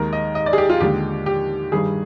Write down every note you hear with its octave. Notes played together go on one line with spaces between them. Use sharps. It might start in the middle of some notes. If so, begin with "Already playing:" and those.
Already playing: D#2 D#3 G#3 A#4
D#5
D#5
D5
G#4
G4
F4
D#2 D3 G#3 G4
G4
G2 D#3 G3 G#4